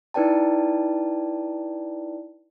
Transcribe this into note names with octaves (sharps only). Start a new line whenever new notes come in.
D#4 E4 B4 D5 G5 A5